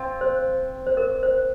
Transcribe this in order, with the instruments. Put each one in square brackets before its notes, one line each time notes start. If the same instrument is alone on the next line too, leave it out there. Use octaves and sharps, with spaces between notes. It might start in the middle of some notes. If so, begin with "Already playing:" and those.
Already playing: [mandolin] C4 F4
[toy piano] C5
C5
A#4
C5